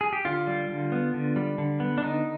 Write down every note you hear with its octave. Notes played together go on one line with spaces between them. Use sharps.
G#4
G4
D3 F4
G3
D3
B3
D3
G3
D3
B3
D4
D3 D#4